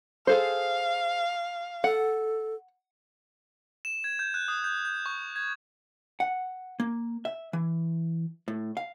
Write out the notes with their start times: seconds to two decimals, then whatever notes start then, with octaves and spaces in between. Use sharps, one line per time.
0.27 G#4 A4 C5 F5
1.84 A4 F#5
3.85 E7
4.04 G#6
4.19 G6
4.34 F#6
4.48 D#6
4.64 G6
4.85 G6
5.06 C#6
5.36 G#6
6.20 F#5
6.80 A#3
7.25 E5
7.53 E3
8.48 A2
8.77 F5